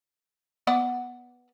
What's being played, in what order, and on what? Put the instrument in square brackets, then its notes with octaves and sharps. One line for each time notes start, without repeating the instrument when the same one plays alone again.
[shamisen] B3 D5 F#5